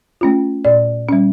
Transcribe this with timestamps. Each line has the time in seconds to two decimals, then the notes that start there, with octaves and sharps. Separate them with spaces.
0.21 A3 C#4 F4
0.65 A#2 D5
1.09 G3 C#4